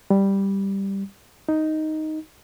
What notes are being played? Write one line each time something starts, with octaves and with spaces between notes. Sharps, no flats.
G3
D#4